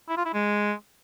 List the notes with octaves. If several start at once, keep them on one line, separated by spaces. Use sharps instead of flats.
E4
F4
E4
G#3